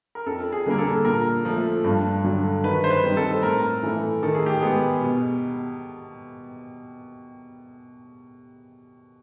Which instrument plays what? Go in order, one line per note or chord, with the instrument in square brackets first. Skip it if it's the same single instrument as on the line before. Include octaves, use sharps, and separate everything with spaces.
[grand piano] A#4
[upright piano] F2 [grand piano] A4
[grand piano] G#4
[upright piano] D3 G3 A#3 [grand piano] A#4
[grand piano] A4
[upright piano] A#2 [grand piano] A#4
[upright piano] F3 A3
G2
D3 F#3
[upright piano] D#3 [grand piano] B4
[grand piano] C5
B4
[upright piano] G3 C4 D#4
[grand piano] A4
[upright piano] A2 [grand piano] A#4
[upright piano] E3 A3
[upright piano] D#3 [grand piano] A4
[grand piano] G#4
G4
[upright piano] G#3 B3 [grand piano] G#4
[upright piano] B2